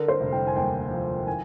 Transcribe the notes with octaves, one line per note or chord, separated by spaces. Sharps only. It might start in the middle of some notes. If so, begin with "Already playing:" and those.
Already playing: D3 A#4
C5
F1
G5
G#5
D#2 G5
F3
D#3 G#5